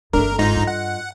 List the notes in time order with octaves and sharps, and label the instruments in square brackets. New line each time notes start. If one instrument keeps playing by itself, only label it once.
[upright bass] G1 C4 [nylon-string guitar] A3 D4 [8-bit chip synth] A#4
[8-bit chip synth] G#2 D#4 A#5 [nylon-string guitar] F4 D#5
[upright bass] G2
[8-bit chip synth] F#5